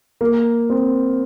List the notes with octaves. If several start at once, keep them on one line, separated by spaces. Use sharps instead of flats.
A#3
C4